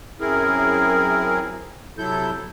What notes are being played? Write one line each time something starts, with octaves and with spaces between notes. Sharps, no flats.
F#2 C4 E4 G#4 A#4
C3 F#3 E4 A4 G6